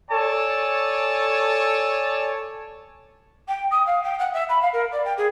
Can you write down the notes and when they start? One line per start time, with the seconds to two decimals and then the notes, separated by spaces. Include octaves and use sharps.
0.11 A4 C#5 D5 G#5 A5
3.48 G5
3.71 D#6
3.86 F5
4.03 G5
4.19 F#5
4.33 E5
4.49 B5
4.61 F5
4.73 A#4
4.91 D5
5.05 G5
5.17 G#4